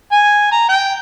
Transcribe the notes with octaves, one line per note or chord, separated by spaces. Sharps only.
G#5
A#5
G5